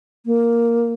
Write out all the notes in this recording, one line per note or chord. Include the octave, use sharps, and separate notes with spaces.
A#3